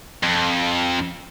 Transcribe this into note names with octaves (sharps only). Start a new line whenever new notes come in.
F2